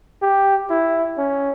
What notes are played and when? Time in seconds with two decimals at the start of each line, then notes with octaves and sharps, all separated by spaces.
0.22 G4
0.70 E4
1.18 C#4